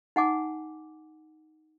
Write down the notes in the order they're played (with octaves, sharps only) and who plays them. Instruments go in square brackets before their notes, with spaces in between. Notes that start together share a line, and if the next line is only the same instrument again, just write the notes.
[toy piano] D#4 F#5 G#5 D6